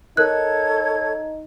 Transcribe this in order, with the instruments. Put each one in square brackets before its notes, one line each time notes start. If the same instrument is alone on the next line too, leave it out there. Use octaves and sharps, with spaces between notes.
[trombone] D#4 [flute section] A4 C#5 G#6 [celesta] A#4 F#6